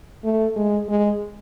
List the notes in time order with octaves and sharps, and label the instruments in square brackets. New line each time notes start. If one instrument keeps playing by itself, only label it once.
[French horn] A3
G#3
G#3